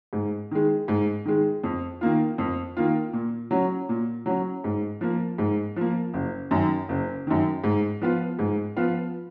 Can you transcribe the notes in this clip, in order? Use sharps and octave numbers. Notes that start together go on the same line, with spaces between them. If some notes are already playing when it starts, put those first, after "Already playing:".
G#2
D#3 G#3
G#2
D#3 G#3
F2
D#3 A#3 F4
F2
D#3 A#3 F4
A#2
F#3 C#4
A#2
F#3 C#4
G#2
F3 A#3
G#2
F3 A#3
F#1
F#2 D#3
F#1
F#2 D#3
G#2
F3 B3 F4
G#2
F3 B3 F4